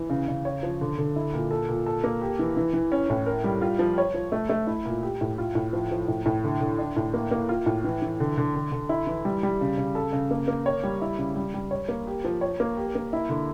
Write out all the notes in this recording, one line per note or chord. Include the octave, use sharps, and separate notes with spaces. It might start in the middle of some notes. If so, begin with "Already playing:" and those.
Already playing: E3
C#3
C#3
C#5
F3
D3
D3
E4
A#2
A4
A#2
A4
A#3
G4
E3
E3
E3
C#4
A2
A#4
G3
F4
F3
C#5
F3
A3
A3
E4
A#2
G4
A2
F4
A2
F3
F3
A2
A2
D3
D3
D4
A2
A#3
A#3
F4
A2
E3
E3
D3
D3
D3
D3
E4
E3
G3
G3
C#3
C#3
A4
C#3
A#3
A#3
C#5
G3
E4
C#3
G3
G3
C#5
A#3
G4
F3
C#5
A#3
G4
A#3
E4
D3